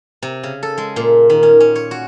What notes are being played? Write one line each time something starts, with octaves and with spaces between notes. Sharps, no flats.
C3
C#3
A4
G#3
A#2
D#3
C#4
C#4
C#5
F#4